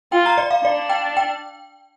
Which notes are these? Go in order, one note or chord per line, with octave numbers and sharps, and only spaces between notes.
F4 G5
A#5
D5
F5
D4 D5
G5
G5